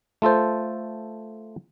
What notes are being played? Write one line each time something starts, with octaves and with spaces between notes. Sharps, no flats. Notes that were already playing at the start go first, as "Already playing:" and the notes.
A3 F4 A4 C5